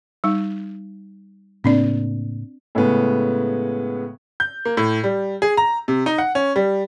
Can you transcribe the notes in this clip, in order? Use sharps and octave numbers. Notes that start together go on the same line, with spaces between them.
G3 D#4
A2 C#3 A#3 C4 D4 D5
A2 C#3 G#3 B3
G6
A#3
A2
G3
G#4
A#5
C3
D#4
F#5
C#4
G3